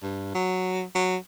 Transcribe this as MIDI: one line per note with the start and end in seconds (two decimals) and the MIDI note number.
0.03 0.33 43
0.35 0.83 54
0.95 1.16 54